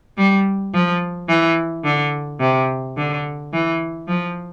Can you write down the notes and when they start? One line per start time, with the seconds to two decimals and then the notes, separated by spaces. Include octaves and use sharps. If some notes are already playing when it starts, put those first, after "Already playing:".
0.18 G3
0.74 F3
1.29 E3
1.84 D3
2.40 C3
2.97 D3
3.53 E3
4.08 F3